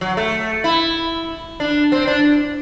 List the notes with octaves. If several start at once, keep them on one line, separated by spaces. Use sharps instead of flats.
F#3
A3
E4
D4
C4
D4